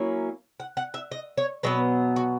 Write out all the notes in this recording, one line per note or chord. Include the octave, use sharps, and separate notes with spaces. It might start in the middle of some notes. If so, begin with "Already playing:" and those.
Already playing: F#3 A#3 C#4 E4
F#5
F#5
E5
D#5
C#5
B2 F#3 B3 B4
F#4